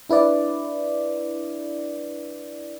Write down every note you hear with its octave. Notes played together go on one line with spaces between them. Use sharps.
D4 E4 B4 D5